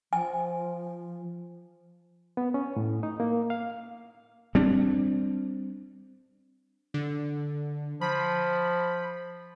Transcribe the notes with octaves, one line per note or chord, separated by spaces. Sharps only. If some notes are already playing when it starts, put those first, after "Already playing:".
F3 G#5
B3
C#4
A2
D#4
A#3
F5
G3 C4 D4
D3
F3 B5